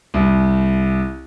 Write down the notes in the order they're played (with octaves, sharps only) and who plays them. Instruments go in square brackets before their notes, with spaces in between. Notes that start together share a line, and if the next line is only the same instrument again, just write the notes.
[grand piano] C2